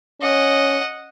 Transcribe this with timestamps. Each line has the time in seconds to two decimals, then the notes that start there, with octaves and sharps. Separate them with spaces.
0.22 C#4 D#5 F#5